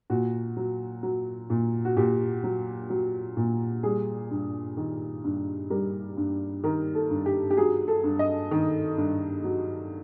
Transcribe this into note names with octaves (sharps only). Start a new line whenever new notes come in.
A#2 F#4
F#3
F#3
A#2
F#4
A#2 G4
F#3
F#3
A#2
G3 G#4
G2
D#3
G2
G3 A#4
G2
D#3 A#4
A4
G2
G4
G4
F#3 G#4
A4
G2
D#5
D#3
G2
F#3